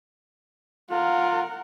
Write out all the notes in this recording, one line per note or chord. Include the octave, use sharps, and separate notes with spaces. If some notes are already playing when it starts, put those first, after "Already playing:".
F4 A#4 F#5